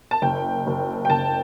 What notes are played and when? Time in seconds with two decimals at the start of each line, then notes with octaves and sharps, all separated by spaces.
0.11 A5
0.22 F#1 G5
0.67 F#1
1.05 G5
1.10 F#1 A5